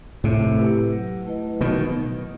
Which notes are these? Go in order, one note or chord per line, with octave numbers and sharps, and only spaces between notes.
A2 C3 A3
E4 G4 B4
F#3
A3 E4 B4 D#5
B2 D#3 F#3